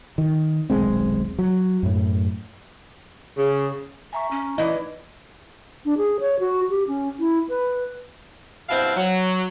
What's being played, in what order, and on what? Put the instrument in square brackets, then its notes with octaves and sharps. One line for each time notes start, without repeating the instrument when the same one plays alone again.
[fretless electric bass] D#3
D#1 B1 G#3 C4
F#3
F#2 A2
[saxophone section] C#3
[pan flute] E5 [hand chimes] G#5 A#5 C#6
[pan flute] C#4
[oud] E3 D#5 [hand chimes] D#4 B4 D5 [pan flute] E4
[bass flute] D4
G#4
C#5
F#4
G4
C#4
E4
B4
[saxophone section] G2 B2 C4 E4 C5 F5
F#3